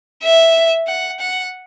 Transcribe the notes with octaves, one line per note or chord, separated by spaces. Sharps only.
E5
F#5
F#5